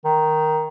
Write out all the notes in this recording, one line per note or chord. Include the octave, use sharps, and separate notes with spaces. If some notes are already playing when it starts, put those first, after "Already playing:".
D#3